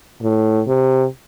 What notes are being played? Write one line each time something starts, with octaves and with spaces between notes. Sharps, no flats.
A2
C3